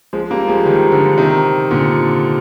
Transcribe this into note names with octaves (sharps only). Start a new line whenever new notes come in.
F3 G#3
G3 A#3
F3 G#3
D#3 G3
D3 F3
C3 D#3
A#2 D3